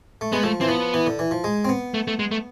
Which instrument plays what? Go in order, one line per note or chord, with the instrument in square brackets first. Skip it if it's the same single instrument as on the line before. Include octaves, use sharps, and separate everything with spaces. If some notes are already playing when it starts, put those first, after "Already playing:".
[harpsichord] A3
[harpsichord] G#3 [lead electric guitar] B3
[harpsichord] F3 [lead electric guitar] A3
[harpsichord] E3 [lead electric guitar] C4
[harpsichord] F3 [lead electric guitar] B3
[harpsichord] E3
D3
E3
F3
G#3
C4
B3
[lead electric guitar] A3
A3
G#3
A3